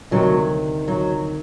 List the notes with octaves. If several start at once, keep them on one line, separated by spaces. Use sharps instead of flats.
D2 C3 D#3 F#3
F#3